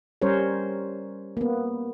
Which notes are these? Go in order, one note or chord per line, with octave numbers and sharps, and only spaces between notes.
G3 C#4 A#4 C5 C#5
A#3 B3